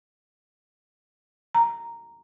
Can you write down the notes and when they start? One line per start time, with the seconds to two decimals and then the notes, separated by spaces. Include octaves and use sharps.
1.55 A#5